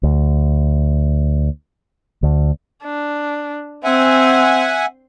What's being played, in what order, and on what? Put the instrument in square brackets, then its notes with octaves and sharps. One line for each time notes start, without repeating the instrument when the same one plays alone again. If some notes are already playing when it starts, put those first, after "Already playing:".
[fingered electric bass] D2
D2
[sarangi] D4
[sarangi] C4 [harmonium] E5 F#5 G#5